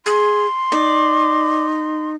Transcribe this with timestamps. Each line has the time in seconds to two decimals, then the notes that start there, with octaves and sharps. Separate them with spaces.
0.06 G#4 C6
0.72 D#4 D5